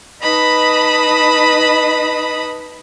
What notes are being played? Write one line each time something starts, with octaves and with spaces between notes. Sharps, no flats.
D#4 B4 D#5 A5 B5 D#6